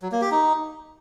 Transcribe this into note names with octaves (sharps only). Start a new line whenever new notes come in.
F#3
A#3
G4
D#4